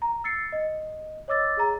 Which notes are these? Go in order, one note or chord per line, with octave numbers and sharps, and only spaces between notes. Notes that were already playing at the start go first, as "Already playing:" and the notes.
A#5
E6 A6 C7 C#7
D#5
C#5 D#5 D6 E6 A6
G#4 A#5